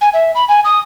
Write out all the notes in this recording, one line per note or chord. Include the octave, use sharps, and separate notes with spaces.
G#5
E5
B5
G#5
D#6